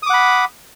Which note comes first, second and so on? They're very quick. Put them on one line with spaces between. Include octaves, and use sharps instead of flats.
D#6 D6 F#5 B5